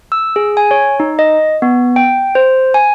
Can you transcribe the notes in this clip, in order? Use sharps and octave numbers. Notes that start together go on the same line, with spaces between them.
E6
G#4
G#5
C#5
D#4
D#5
B3
G5
C5
G#5